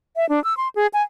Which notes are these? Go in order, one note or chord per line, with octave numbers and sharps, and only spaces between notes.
E5
D4
E6
C6
G#4
G#5